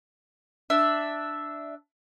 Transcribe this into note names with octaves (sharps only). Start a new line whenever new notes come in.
D4 E5